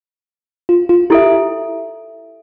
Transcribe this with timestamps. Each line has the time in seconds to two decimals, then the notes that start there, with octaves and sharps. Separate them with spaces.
0.69 F4
0.89 F4
1.10 E4 G4 A4 E5